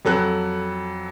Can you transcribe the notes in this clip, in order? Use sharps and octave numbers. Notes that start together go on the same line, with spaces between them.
F2 F#3 A4 F#6